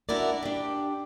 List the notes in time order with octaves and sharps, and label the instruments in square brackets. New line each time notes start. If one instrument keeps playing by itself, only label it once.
[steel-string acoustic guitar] D4 E4 F#4 A#4 D5
D4 G4